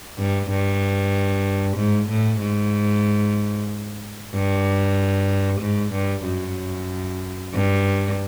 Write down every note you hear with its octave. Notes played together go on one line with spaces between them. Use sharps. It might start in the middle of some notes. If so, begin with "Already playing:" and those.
G2
G2
G#2
A2
G#2
G2
G#2
G2
F#2
G2